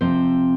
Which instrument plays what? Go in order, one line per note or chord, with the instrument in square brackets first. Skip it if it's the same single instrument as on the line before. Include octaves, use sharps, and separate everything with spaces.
[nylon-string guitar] C3 F3 C4 C5